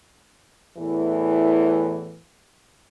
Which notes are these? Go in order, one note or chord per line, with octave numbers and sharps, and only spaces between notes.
E2 A2 E3